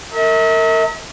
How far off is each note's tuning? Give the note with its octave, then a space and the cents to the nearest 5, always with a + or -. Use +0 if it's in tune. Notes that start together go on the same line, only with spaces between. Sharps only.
A#4 -35 E5 -45